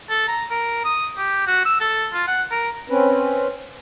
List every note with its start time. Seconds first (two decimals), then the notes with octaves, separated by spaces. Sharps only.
0.10 A4
0.28 A#5
0.50 A#4
0.85 D#6
1.18 G4
1.47 F#4
1.65 E6
1.81 A4
2.14 F4
2.28 F#5
2.51 A#4
2.90 C4 C#4 B4